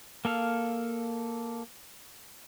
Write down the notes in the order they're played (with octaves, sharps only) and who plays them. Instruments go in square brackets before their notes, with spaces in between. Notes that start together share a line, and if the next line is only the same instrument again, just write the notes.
[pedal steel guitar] A#3 A4 F5